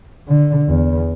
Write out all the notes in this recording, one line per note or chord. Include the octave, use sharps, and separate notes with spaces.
D3
E2